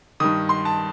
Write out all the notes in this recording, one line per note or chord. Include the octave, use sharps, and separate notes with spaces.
G2 D#3 D#6
C6
A5